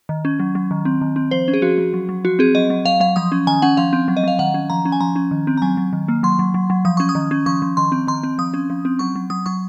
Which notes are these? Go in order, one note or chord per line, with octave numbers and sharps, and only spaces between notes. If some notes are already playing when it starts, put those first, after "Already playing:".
D#3
C#4
F#3
F#3
D#3
C4
D#3
C4
F3 C5
C#4
G#4
F3 F#4
F3
F#3
F#3
F3 F#4
C4 G#4
F#3 D#5
F#3
F#3 F5
F#3 F5
F3 D#6
C#4
D#3 G#5
C#4 F#5
F3 F5
C4
F#3
D#5
F#3 F5
D#3 F#5
C#4
F3 A#5
C#4
G#5
F3 A#5
C#4
D#3
C4
A#5
F#3 G#5
F#3
D#3
A#3
F#3 C6
F#3
F#3
F#3
F3 D#6
C#4 C#6
D#6
D#3
C#4
F3 C#6
F3
D#3 C6
C4
D#3 C6
C4
F3 D#6
C#4
F3
C4
F#3 C#6
F#3
F#3 D#6
F#3 C#6